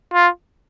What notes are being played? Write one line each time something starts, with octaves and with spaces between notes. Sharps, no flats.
F4